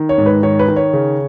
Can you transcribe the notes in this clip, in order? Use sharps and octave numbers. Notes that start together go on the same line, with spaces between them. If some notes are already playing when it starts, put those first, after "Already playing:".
Already playing: D#3
C#5
G#2
B4
D#3 C#5
B4
D#3
C#5
C#3